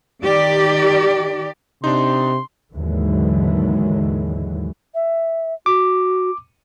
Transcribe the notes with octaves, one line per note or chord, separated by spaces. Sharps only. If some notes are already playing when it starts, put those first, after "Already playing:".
D#3 G4 D5
C3 D4 D#4 C6
D#2 G#2 D3 E3 F#3 G#3
E5
F#4 D6